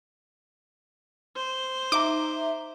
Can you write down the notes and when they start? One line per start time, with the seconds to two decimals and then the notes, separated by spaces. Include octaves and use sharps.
1.36 C5
1.92 D#4 E5 A#5 D6